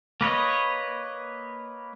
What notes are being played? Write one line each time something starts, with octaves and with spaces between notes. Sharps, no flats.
A#3 B4 C#5 D#5